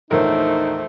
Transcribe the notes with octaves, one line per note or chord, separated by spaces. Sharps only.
A#1 E2 A3 D#4 A#4 C5 C#5